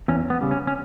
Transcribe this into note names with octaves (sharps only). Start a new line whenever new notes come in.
E2 C#4
B3
C#3 G3
C#4
C#4